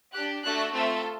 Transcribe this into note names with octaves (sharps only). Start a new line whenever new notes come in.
D4 G4 F#6
A3 D4 F#4 A4 F#6
A3 C4 F4 A4